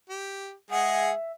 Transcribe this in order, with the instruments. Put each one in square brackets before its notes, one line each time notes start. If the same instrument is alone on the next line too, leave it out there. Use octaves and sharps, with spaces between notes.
[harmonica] G4
[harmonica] G#3 G#4 [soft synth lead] E5 [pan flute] F#5